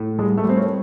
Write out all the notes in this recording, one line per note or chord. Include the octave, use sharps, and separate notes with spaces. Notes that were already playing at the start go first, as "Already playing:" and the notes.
Already playing: A2
G3 G#3
A3
G3 C4
C#4